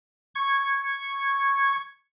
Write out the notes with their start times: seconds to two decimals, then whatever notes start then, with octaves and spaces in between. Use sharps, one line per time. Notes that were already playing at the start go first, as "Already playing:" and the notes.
0.35 C#6 G#6